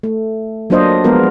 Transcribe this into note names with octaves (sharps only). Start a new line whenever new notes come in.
A3
F#3 A#3 D4 F4 C5 D#5
F3 G#3 B3 F4 A#4